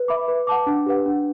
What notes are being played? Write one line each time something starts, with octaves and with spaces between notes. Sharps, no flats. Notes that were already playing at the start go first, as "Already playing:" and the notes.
Already playing: B4
E5 B5 D6
B4
F#5 A5 D6
D4
G4 B4 F#5
D4